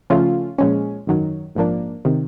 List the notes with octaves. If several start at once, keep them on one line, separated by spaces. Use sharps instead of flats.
C#3 F3 A3 C#4 F4
A#2 F3 G#3 C#4
G#1 F#2 D#3 F#3
A#1 G#2 F3 A#3 D4
C3 D#3